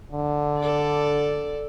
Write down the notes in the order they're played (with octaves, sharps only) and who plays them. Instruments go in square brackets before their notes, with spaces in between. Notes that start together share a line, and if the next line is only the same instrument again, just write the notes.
[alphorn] D3
[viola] A4 D5